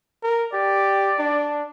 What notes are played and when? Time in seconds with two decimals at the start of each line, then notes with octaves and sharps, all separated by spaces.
0.23 A#4
0.53 G4 D5
1.19 D4